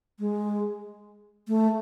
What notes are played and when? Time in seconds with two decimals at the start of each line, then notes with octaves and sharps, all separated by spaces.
0.19 G#3
1.48 A3